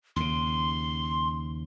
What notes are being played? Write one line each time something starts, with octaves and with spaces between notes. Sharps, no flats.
D#2 C#3 C6